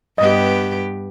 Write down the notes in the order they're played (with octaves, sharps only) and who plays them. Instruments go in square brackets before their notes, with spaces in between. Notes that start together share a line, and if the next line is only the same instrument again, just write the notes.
[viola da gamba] G2 B3 G4 [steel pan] D#5